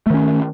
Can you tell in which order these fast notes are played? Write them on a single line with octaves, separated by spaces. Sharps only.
A3 D#3 C#4